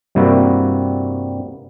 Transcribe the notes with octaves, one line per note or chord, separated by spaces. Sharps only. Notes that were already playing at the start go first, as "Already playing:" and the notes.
G2 C3 G3 A#3 E4 F#4